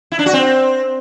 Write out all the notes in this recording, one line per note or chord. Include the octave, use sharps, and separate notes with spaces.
E4
D4
F#4
C4